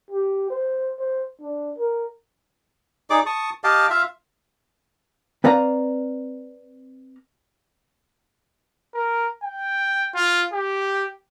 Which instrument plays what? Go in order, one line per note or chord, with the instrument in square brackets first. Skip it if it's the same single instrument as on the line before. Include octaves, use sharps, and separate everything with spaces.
[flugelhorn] G4
C5
C5
D4
A#4
[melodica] D#4 G#4 D5 D6
A5 C#6 D#6
G4 D#5 F5 A5
F4 E5 F5
[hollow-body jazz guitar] C4 B4 D5 F5 A#5
[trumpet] A#4
G5
F4
G4